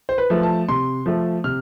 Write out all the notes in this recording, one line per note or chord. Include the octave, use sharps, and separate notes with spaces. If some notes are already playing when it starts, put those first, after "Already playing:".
C5
B4
F3 A3
A5
C3 C6
F3 A3
C3 F6